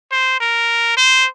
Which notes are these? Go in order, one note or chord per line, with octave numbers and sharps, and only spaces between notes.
C5
A#4
C5